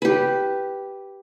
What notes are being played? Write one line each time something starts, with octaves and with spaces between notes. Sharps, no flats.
G4 B4